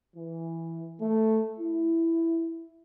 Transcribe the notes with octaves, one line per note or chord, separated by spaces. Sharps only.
E3
A3
E4